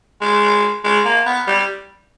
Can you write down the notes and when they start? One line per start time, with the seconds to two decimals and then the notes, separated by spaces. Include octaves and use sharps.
0.21 G#3
0.84 G#3
1.05 A#3
1.26 B3
1.47 G3